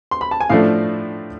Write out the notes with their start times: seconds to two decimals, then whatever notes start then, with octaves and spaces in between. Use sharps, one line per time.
0.11 C6
0.21 B5
0.31 A5
0.40 G#5
0.50 A2 F3 A3 D4 F5